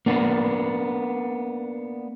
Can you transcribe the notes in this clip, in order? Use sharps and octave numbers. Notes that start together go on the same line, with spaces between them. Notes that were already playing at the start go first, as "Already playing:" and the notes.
A#3 B3 D4